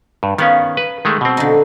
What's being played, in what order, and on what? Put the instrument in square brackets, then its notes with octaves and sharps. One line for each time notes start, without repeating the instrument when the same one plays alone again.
[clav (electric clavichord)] G2
[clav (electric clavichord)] D#3 B3 C#4 [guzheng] F5
[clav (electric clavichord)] B4
D#3 G#3 A3
B2 C4
[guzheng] D3 D#4